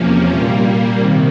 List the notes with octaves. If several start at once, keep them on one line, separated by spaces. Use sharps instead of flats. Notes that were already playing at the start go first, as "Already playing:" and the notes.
Already playing: E2 C3 F3 A#3 C#4
A#2 G3 A#3
C3 D#3